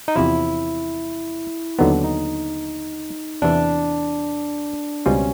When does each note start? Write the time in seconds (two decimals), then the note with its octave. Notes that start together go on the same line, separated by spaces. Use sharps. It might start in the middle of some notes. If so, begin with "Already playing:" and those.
0.08 D#4
0.16 E2 C3 F3 E4
1.79 D#2 D3 F#3 B3 D#4
1.91 D4
2.04 D#4
3.42 E2 C3 E3 D4
5.06 C#2 B2 G3 C4 C#4 F4